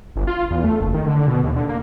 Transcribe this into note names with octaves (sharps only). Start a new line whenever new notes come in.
G1
F4
E2
A3
F#1
D#3
D3
B2
D#2
D3
A#3